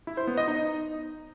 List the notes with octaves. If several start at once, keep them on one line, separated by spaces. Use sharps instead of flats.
E4
C5
B3
D#5
D#4